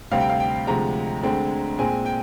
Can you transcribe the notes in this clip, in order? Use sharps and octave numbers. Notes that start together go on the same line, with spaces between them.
D2 C3 G3 C4 F5
G5
F5
G5
D2 C3 F3 G#3 A#5
D2 D3 G#3 C4
A#2 G#3 C4 G#5
G5